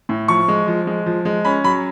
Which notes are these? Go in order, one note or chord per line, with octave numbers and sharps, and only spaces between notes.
A2
F3 C#6
G#3
F3
G#3
F3
G#3
C#4 B5
F#3 B5